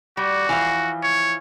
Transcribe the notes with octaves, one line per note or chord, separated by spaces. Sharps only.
G3 F#4
E3 F3 F5
C#5